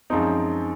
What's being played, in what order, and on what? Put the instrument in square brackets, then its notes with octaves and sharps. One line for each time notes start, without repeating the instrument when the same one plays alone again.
[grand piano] F#2 F3 G#3 C4 D#4